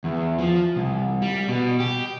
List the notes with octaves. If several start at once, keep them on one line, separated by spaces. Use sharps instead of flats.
E2
F3
C2
G3
B2
G4